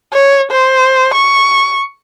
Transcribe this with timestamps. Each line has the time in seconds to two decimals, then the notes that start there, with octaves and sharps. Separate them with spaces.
0.13 C#5
0.51 C5
1.14 C#6